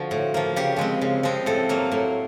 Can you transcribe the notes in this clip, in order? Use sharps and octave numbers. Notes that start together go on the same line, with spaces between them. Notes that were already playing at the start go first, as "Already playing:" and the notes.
Already playing: D3 F3 F#4
A2
F3 A#3
C#3 G4
F3 G#3 C4
C#3
F3 G#3 C4
A2 A4
F#3 A#3
A2